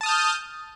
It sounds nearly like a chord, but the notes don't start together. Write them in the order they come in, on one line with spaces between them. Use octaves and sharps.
A5 D#6 F6 G6